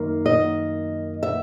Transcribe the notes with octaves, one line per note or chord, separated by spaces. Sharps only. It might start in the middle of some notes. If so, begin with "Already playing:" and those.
Already playing: F#2 D#3 A#3
D#5
E5